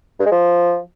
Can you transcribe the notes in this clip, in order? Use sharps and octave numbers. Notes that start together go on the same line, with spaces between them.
G2
G#3
F3